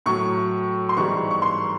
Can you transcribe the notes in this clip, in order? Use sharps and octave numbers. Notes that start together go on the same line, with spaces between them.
A2 F#3 C#6
C6
G#2 E3 G3 C#6
C#6
C6